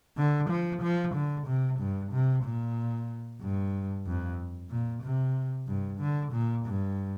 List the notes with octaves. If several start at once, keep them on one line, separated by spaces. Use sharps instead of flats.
D3
F3
F3
D3
C3
G2
C3
A#2
G2
F2
A#2
C3
G2
D3
A#2
G2